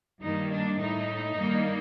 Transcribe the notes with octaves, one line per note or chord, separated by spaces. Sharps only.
G2 D#3 G3 A#3 D#4
D4
A2 A3 D#4
G2 D#3 G3 A#3